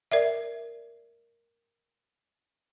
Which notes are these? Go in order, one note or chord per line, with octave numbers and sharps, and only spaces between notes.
A#4 D5 E5